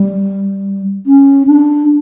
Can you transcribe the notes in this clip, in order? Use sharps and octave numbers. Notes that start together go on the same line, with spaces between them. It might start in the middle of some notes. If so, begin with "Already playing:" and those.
Already playing: G3
C#4
D4